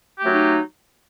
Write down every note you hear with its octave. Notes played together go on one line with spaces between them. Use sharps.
F#3 A3 D#4 G4